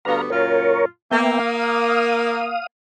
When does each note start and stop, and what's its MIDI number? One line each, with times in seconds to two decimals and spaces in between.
0.05 0.26 38
0.05 0.26 55
0.05 0.26 59
0.05 0.21 71
0.05 0.21 77
0.05 0.21 82
0.30 0.84 42
0.30 0.84 46
0.30 0.84 65
0.30 0.85 70
0.30 0.85 73
1.11 2.58 58
1.11 1.39 59
1.11 1.39 76
1.11 1.39 79
1.40 2.66 77
1.40 2.66 87